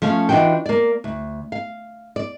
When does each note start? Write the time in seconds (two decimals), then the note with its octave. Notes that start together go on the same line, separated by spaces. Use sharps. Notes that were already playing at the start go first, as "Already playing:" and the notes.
0.02 F3 A3 C#4 F5
0.29 E3 D4 D#4 F4 F#4 G5
0.66 A#3 D5
1.04 D2
1.52 F5
2.16 D5